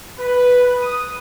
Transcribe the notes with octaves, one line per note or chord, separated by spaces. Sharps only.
B4
D#6